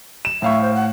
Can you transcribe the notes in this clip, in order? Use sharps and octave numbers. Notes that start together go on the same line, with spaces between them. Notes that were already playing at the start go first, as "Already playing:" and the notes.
E7
A2 E5 F5 C#6
C5
F#5